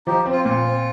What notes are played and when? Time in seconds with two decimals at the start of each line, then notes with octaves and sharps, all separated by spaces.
0.07 F3 D#4 G4
0.26 C4
0.32 F4
0.45 A#2 F4
0.65 C4